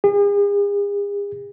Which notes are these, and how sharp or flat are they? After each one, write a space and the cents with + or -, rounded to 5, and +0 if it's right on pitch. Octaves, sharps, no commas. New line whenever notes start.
G#4 -45